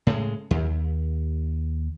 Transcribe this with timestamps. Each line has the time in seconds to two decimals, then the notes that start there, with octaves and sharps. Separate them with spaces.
0.07 A2 C#3 G#3
0.51 D#2